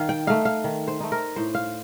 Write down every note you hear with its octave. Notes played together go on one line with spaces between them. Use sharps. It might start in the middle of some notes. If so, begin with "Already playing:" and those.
Already playing: D#3 F5
G5
A3 D#4 F5
F5
D#3
C5
A3 D#4
A#4
A2 C5
F5